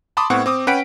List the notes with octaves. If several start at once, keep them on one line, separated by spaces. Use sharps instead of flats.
A5 B5 C6 D6 D#6
A2 B3 C4 F#5 C#6
C4 D6 D#6
C#4 B4 F#5 G5 B6 D7